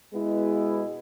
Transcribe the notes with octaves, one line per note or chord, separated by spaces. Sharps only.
B2 G#3 B3 E4